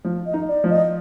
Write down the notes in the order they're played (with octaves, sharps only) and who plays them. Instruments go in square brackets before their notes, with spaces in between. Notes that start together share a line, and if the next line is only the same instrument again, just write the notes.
[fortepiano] F3
[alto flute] D#5
[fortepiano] D#4
[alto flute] D5
[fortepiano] F3
[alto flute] D#5